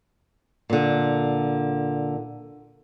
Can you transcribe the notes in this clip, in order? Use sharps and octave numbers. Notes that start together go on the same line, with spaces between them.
A#2 D3